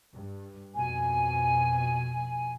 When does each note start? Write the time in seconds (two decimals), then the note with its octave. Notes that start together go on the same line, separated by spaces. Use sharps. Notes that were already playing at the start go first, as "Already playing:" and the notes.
0.16 G2
0.75 F2 B2 G#5